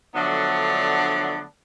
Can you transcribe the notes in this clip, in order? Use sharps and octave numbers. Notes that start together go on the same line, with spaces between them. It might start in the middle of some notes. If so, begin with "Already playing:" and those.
D3 F3 F#3 A3 B3 D4